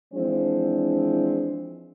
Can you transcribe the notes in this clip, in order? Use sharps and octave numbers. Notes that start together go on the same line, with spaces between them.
E3 F3 G#3 C4 D4